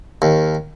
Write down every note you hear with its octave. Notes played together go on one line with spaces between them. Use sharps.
D#2